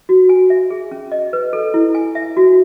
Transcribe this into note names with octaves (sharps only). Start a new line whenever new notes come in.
F#4
G#5
E5
G#4
C#4
D#5
B4
A4
E4
G#5
E5
F#4